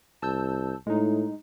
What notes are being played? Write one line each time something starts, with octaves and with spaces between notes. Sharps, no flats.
C2 A5 E6 G6
A2 G#3 D#4